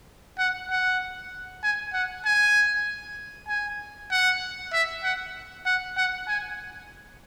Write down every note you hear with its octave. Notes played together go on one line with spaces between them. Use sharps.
F#5
F#5
G#5
F#5
G#5
G#5
F#5
E5
F#5
F#5
F#5
G#5